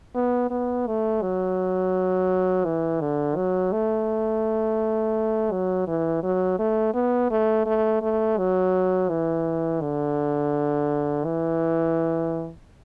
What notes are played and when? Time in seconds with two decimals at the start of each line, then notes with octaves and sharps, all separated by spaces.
0.15 B3
0.50 B3
0.87 A3
1.22 F#3
2.65 E3
3.01 D3
3.36 F#3
3.72 A3
5.52 F#3
5.87 E3
6.23 F#3
6.59 A3
6.94 B3
7.31 A3
7.66 A3
8.02 A3
8.38 F#3
9.09 E3
9.81 D3
11.24 E3